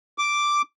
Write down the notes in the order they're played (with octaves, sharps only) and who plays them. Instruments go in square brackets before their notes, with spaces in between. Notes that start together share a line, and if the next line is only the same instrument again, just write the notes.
[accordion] D6